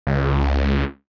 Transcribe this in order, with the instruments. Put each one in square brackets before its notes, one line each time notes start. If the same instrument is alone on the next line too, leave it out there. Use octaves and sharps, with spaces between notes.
[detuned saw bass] C#2